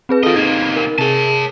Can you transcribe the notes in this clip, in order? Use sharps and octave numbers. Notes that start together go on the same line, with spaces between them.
C4 G#4 B4
D#3 F4 A4 D#5
C3 A#3 D#4 G#6
C4
A#4
C3 G#4 C#5 A5